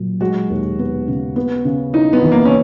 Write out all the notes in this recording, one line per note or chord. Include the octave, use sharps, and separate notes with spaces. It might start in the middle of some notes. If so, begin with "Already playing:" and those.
Already playing: A#2 F#3
G#3 F#4
D#2
B3
C#3
B3
C#3
D#4 E4
B3
E3
A#3
C#4